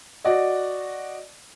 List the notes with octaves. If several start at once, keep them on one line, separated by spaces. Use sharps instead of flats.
F#4 D5 D#5